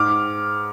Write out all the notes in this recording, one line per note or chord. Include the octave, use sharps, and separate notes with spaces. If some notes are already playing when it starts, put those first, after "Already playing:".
Already playing: G#2 D6 F6